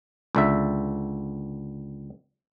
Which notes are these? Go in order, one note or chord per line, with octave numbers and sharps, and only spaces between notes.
C#2 D3 E5